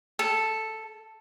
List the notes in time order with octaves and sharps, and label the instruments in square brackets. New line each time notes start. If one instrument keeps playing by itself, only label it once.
[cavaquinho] A4